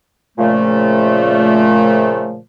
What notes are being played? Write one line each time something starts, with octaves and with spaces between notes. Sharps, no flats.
A#2 C#3 F3 A3